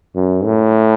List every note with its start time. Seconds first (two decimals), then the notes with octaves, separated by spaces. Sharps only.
0.15 F#2
0.44 A2